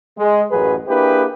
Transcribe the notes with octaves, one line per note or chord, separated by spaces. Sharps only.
G#3
A1 F#2 F#3 G#4 B4
A#3 D4 E4 G4 G#4 B4